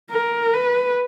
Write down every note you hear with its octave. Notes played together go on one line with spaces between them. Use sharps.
A#4
B4